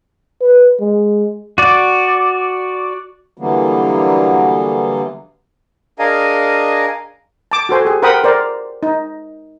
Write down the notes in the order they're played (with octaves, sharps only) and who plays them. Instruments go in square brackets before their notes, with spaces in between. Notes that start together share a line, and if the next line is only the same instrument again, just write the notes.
[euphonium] B4
G#3
[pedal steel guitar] F#4 D5
[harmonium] D3 E3 F#3 G3 A#3 B3
[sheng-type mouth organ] D4 G#4 A#4 D#5 F5 G#5
[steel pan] A5 D6
F#4 A4 C5 G#5
G4 G#4
A#4 C5 F#5 G5 B5 D#6
A#4 C5 D5
D#4